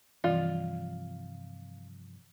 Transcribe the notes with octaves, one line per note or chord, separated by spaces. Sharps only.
G2 C3 E3 F3 F4 D5